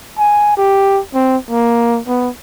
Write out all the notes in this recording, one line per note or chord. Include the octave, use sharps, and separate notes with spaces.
G#5
G4
C4
A#3
B3